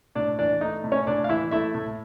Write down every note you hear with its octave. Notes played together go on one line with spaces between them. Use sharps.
A2 D4 D5
E3 D4 D5
A3 D#4 D#5
A2
C#4 C#5
A2 D4 D5
F5
E3 E4 E5
A3 E4 E5
A2